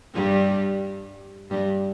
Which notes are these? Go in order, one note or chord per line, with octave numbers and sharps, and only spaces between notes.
G2 G3
G2 G3